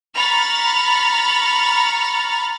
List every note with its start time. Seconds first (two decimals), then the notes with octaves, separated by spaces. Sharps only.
0.14 A#5 B5 C#6 F6 A6